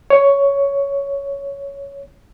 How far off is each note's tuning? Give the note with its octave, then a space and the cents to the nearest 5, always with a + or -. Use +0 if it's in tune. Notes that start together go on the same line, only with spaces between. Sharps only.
C#5 +10